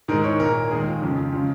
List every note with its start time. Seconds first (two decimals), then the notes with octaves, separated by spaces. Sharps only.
0.08 G#2 D#3 G#3 A#4
0.24 C#5
0.40 A#2 A#3 A#4
0.71 D#2 D#3 G#3 G#4
0.87 F4
1.02 F2 C#3 F3 G#3
1.33 C#3 F3 G#3 F4